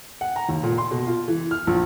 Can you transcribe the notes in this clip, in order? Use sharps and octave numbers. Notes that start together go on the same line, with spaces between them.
F#5
A#5
D#2
A#2
C6
B2
F4
E3
F6
A#1